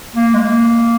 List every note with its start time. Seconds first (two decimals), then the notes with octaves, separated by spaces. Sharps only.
0.16 A#3
0.34 G#3
0.40 A#3